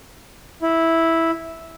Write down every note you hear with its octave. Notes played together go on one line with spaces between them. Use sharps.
E4